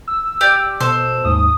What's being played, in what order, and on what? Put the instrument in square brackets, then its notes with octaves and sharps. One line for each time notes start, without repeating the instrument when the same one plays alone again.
[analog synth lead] E6
[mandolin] G4 D5 G6
[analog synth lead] B2 [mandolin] A4 C5
[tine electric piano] D#2 G#2 [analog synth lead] D#6